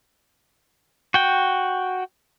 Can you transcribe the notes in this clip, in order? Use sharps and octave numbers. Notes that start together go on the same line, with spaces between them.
F#4 G5